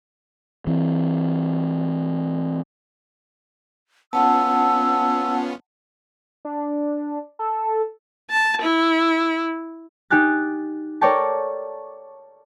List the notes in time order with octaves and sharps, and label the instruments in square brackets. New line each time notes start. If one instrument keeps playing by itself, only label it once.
[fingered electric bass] E3 C4
[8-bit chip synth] B3 C#4 F4 [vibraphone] F#5 A5 [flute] E6
[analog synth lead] D4
A4
[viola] A5
E4
[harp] D#4 G4 G#5 F#6 A6
A4 A#4 C#5 D5 G5 A5